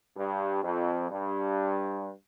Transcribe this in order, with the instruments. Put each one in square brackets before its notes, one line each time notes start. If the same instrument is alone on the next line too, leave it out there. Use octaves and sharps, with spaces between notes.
[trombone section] G2
F2
G2